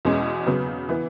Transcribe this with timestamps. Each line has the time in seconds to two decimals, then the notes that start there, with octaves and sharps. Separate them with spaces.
0.05 E2 B2 G#3 C#4
0.47 C#3 F#3 B3
0.89 E3 B3